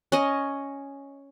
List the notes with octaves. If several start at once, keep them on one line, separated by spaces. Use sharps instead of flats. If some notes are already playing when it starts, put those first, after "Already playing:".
C#4 D#5